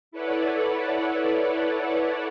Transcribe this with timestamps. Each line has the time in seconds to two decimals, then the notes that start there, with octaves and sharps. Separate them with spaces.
0.12 E4 A4 B4 C#5 D5 F#5